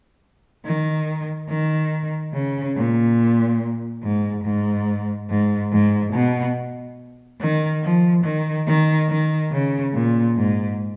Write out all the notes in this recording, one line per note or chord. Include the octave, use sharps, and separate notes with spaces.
D#3
D#3
C#3
A#2
G#2
G#2
G#2
G#2
B2
D#3
F3
D#3
D#3
D#3
C#3
A#2
G#2